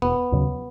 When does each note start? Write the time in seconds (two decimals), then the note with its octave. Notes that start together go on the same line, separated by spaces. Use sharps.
0.02 E1 B3
0.32 D#2 C#3 F#3